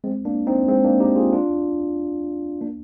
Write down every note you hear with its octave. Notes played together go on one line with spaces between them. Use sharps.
G#3 C4
A#3 D4
C4 D#4
G#3 C4
A#3 D4
D#4 G4
F4 G#4
D4 F4
A#3 D4